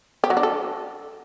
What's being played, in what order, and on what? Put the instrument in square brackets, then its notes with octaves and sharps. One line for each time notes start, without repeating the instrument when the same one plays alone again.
[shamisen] G4
F#3
D4
A4